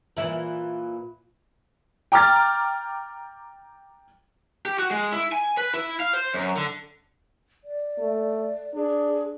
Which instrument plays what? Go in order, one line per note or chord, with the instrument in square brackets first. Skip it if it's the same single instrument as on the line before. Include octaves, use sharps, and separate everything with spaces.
[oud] A#2 E3 E4
[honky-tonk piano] G5 A#5 D6 F6 A6
[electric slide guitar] G4
F#4
G#3
E4
G#5
B4
E4
F5
C5
F#2
D3
[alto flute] D5
[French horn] A3
[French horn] D4 [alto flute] G#4